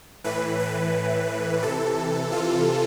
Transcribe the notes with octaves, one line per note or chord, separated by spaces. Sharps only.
A2 E3 B4
B4
C3 E3 A4
F4